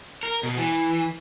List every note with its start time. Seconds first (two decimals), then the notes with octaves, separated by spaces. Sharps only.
0.23 A#4
0.43 B2
0.57 E3